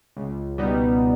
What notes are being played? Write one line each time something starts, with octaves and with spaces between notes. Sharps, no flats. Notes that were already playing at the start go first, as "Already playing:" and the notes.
C#2
B2 G3 B3 D#4